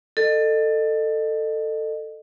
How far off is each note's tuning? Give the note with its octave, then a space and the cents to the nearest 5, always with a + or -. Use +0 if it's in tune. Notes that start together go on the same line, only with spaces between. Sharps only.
A4 +15 D#5 -30